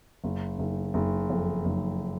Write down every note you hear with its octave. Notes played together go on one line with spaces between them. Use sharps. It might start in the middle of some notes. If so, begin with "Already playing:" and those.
F#1
F#1
F#1
F2
F#1